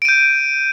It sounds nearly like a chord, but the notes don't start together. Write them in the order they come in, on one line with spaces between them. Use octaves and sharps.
D7 D#7 G6